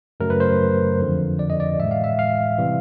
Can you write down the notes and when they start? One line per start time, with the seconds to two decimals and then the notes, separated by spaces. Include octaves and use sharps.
0.20 F#2 C#3 F#3 A3 A#4
0.30 B4
0.40 C5
1.00 F2 D3 F3
1.39 D5
1.50 D#5
1.60 D5
1.79 A2 E3 G#3 E5
1.91 F5
2.04 E5
2.19 F5
2.58 C3 E3 G3